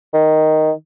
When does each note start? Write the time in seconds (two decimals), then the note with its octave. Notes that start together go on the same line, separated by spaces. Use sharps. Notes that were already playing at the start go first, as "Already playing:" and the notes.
0.14 D#3